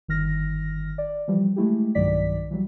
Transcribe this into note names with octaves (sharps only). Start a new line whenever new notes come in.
G1 D#3 F6 A#6
D5
E3 F3 G3
G#3 A3 E4 G4
B1 G2 D#3 F#3 D5 B6
E3 F#3 G3